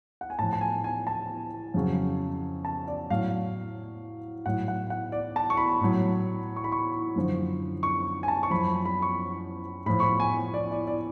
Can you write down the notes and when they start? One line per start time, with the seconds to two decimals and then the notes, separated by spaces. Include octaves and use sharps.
0.21 F#5
0.30 G#5
0.39 A2 F3 A5
0.53 A5
0.61 G#5
0.84 G#5
1.07 A5
1.74 F2 C#3 F#3
2.65 A5
2.88 D5
3.10 A2 F#3 F5
4.46 A2 F#3 F#5
4.68 F#5
4.90 F#5
5.12 D5
5.36 A5
5.50 C#6
5.57 B5
5.81 A2 F#3
6.56 C#6
6.64 B5
6.72 C#6
7.16 F#2 D3 F3
7.83 C#6
8.23 G#5
8.28 A5
8.43 C#6
8.51 F#2 F3 B5
8.85 B5
9.02 C#6
9.86 A2 F3 B5
10.00 C#6
10.03 B5
10.20 G#5
10.54 D5
10.72 D5
10.87 D5